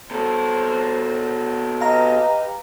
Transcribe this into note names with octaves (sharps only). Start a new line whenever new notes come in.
B2 A4 C5
G4 B4 D#5 F5 A#5